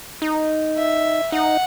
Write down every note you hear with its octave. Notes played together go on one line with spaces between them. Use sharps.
D#4
E5
D#4 F#5